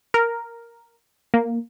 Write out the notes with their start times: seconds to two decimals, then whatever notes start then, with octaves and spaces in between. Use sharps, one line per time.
0.14 A#4
1.34 A#3